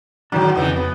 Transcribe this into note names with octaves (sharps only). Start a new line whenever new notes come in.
G#2 D#3 E3 F#3 D4
F2 C#3 E3 D#4
B3